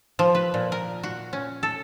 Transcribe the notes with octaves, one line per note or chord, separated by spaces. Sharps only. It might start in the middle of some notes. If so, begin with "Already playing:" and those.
F3
B4
A#2
A#4
F#4
C#4
A4